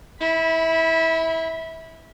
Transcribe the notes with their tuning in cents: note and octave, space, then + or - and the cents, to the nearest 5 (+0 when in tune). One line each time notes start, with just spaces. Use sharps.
E4 -25 B5 +0